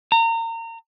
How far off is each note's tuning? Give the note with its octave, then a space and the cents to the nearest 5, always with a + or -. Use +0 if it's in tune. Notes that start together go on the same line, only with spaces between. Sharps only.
A#5 -30